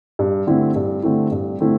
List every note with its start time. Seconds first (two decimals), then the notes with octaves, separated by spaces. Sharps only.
0.19 G2
0.47 D3 A3 C4 E4
0.76 G2
1.03 D3 A3 C4 E4
1.32 G2
1.60 D3 A3 C4 E4